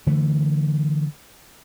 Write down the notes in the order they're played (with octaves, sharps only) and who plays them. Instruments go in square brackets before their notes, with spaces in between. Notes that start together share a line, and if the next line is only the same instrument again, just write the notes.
[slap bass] D3 E3 A3